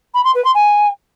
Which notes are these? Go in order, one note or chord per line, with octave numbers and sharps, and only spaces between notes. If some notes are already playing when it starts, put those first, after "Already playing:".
B5
C6
B4
C6
G#5